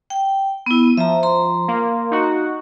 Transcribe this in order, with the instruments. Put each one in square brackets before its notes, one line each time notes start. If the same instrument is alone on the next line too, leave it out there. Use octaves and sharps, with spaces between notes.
[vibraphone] G5
[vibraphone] B3 E4 [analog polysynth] D#7
[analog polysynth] F3 [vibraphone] E5 A#5
[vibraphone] A#5 C6
[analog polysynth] A#3
D#4 F#4 F#5